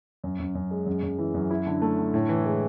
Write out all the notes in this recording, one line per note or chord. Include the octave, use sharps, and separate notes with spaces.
F#2
F#2
F#2
G#3
F#2
F#2
E3
F#2
E4
D3
A3
D3
A2
E3
G#3